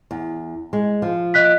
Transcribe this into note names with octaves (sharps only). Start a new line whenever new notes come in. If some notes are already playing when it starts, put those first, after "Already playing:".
E2
G#3
F3
D#5 F#6 B6